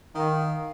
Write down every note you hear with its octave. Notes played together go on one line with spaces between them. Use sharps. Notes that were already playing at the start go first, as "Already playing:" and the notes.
D#3 F5